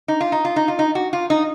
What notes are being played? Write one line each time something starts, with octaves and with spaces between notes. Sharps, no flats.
D#4
F4
D#4
F4
D#4
F4
D#4
F#4
F4
D#4